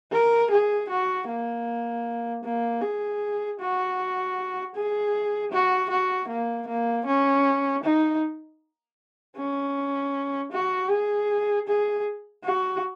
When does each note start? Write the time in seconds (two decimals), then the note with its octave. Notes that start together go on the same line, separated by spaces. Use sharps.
0.12 A#4
0.51 G#4
0.89 F#4
1.28 A#3
2.44 A#3
2.81 G#4
3.59 F#4
4.75 G#4
5.51 F#4
5.90 F#4
6.28 A#3
6.67 A#3
7.06 C#4
7.83 D#4
9.37 C#4
10.52 F#4
10.90 G#4
11.68 G#4
12.44 F#4